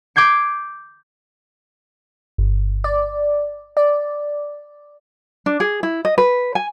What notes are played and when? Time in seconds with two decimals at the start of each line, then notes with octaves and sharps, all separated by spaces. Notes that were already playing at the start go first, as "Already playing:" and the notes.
0.16 D6 G6 G#6 C7
2.38 G1
2.84 D5
3.77 D5
5.46 D4
5.60 G#4
5.83 E4
6.05 D#5
6.18 B4
6.55 G#5